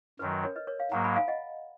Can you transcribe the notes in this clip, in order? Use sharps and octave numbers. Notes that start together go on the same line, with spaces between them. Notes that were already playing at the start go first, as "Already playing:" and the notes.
F#2 D#3 F#3 B4
B4
A#4 C#5
B4 D#5
A#4 C#5
C#5 F5
G#2 F#3 A#3 F#5 A#5
G#5 B5
F5 G#5
D#5 F#5